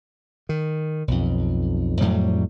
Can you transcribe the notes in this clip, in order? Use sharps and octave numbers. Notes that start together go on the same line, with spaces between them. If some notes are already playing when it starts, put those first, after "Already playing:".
D#3
B1 F2
F2 A2 F#3 G3